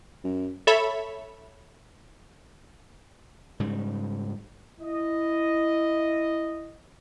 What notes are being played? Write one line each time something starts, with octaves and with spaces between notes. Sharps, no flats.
F#2
A4 C#5 E5 B5
G#2 C#3 G3
E4 D#5